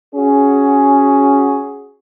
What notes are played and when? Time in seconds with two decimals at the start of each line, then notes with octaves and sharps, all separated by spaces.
0.15 C#4 F#4 G#4